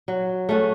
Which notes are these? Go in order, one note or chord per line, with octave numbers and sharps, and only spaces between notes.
F#3
A3 C#4 F#4